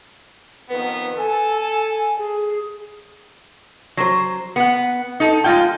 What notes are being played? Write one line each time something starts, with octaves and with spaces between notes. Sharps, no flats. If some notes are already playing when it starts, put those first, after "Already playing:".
F2 D#3 B3 B4
A4 G#5
G#4
F#3 C5
B3 F#5
D#4 A4
G#3 F4 G5